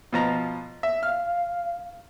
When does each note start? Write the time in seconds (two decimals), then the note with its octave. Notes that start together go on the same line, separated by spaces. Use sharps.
0.12 B2 F3 A#5
0.83 E5
1.03 F5 F6